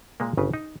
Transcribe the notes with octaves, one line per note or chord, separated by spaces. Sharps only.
A#2 G#3 A#3
G1 C#3 B4
D#4